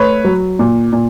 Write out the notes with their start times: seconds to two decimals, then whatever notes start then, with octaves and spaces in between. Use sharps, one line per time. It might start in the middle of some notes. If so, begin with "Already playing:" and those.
Already playing: A3 B4 C#5
0.25 F#3
0.59 A#2
0.93 A#2